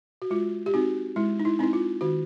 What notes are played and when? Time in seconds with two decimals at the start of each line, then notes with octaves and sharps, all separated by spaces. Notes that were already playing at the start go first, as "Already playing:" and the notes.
0.22 F#4
0.30 G#3 F4
0.66 G4
0.74 C4 D#4 F#4
1.16 G#3 E4
1.40 D#4
1.45 E4
1.59 C4 D#4 E4
1.73 F4
2.01 D#3 F#4